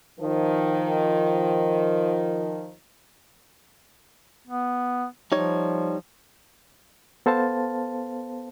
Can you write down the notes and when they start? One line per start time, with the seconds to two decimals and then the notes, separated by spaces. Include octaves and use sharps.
0.20 D#3 F3
4.47 B3
5.32 F3 G3 D#4 C#5
7.26 B3 A4 C5 F5 A5